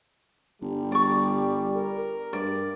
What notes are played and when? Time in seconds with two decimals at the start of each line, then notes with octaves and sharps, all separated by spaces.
0.62 G1 G3
0.92 D5 C#6
1.77 A#4
2.33 G2 D5